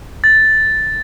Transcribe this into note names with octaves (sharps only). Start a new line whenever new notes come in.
A6